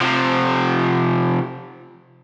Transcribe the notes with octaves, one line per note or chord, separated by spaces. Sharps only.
C3 F3